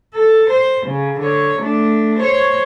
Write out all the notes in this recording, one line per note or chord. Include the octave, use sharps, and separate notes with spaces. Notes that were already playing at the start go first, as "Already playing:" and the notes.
A4
C5
C#3
D3 C#5
A3 D4
C5 C#5